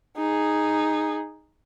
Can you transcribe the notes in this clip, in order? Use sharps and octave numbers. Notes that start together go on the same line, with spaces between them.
D#4 G#4